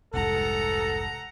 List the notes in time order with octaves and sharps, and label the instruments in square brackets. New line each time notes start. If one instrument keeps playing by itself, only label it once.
[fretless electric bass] F1 C2 G#2 [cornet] A4 [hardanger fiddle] F#5 A#5